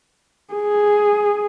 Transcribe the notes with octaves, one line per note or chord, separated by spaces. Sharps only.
G#4